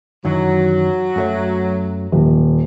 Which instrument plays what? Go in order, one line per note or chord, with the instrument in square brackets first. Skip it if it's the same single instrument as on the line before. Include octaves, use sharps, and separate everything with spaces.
[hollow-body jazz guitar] F#2 D#3 E3 [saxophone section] F#3
[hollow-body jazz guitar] F#2 A3 C#5
[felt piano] D#1